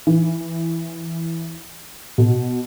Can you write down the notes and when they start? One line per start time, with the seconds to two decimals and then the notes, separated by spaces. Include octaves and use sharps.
0.07 E3
2.18 B2